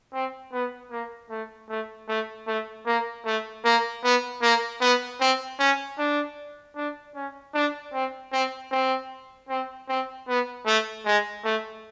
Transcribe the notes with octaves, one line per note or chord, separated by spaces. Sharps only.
C4
B3
A#3
A3
A3
A3
A3
A#3
A3
A#3
B3
A#3
B3
C4
C#4
D4
D4
C#4
D4
C4
C4
C4
C4
C4
B3
A3
G#3
A3